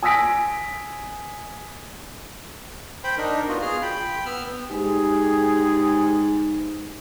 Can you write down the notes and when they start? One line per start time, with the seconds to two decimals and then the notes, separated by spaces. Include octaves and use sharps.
0.03 G#5 D#6 E6 A#6 B6 D7
3.04 C5 G5 B5
3.17 D4 D#4 A#4
3.48 B3 F4 F#4
3.62 F4 G#4 F6
3.82 G5 B5
4.26 B3 E6 F6
4.71 G#2 G4 G#4